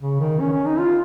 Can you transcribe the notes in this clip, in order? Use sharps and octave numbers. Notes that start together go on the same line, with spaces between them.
C#3
D#3
C#4
C#4
D#4
F4